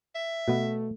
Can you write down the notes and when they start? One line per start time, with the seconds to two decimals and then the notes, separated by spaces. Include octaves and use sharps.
0.15 E5
0.48 B2 A3 B3